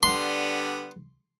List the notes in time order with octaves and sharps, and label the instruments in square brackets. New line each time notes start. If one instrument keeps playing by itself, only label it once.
[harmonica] D3 G3 B3 [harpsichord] C6